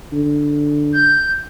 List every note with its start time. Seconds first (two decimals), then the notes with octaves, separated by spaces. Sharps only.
0.12 D3
0.93 G6